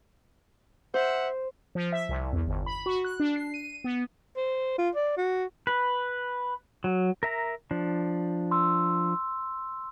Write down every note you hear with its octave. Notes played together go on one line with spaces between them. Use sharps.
C5 E5 F#5
F3
E5
C2
E2
G1
B5
F#4
F#6
D4
C7
D#7
B3
C5
F4
D5
F#4
B4
F#3
A#4 E5 A#5
F3 D4
C6 E6